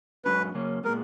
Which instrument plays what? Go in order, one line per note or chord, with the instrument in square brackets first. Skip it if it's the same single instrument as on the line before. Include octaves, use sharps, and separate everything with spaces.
[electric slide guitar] F#2 C#3 G#3 C#4 F#4 [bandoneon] B4
[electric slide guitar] C#3 F#3 A#3 C#4
[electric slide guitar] A#2 G#3 B3 [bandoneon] A#4